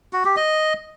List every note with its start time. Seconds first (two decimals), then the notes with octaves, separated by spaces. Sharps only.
0.13 F#4
0.25 G4
0.36 D#5